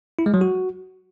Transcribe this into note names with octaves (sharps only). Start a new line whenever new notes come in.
E4
G#3
F#3
F#4